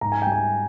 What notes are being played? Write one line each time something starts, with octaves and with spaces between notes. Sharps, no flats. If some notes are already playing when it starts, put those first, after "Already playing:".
G#2 A#5
G#5
G3 G5
G#5